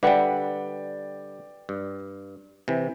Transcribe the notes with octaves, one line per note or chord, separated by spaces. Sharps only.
D3 G3 B4 D5 E5 F#5 G5
G2
C3 E3